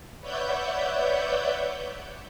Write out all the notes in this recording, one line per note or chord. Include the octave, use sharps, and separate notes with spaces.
B4 C#5 D5 E5 F#5 G6